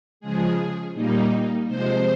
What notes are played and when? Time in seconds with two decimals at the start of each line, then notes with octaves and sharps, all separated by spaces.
0.20 C#3 F3 G#3 G#4
0.93 A#2 G3 A#3 D#4
1.67 C3 F3 G#3 C5